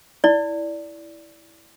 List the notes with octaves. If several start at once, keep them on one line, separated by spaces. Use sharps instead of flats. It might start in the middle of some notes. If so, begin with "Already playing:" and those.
E4 D5